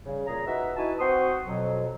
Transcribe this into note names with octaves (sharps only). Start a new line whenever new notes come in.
C#3 G3
A#2 G#4 A#5
D#4 F#4 B4 E5
D#4 E4 F#4 B4 G#5 A5
C4 F#4 C5 C6 C#6 D#6
F2 B2 F#3